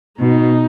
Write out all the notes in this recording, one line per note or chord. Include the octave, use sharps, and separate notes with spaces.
B2 D#4